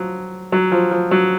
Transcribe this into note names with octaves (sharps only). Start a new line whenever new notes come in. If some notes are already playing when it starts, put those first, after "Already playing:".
Already playing: F3 F#3
F#3
F3
F3
F#3